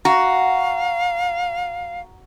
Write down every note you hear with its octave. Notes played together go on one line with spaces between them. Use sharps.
F#4 F5 A#5